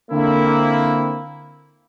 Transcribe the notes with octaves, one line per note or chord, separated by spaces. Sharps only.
D3 A#3 C4 E4